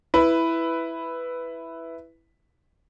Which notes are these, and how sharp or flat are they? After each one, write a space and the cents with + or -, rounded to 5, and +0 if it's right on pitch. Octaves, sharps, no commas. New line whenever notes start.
E4 +0 B4 +5